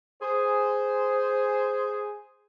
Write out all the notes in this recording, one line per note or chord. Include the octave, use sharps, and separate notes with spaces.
G#4 C5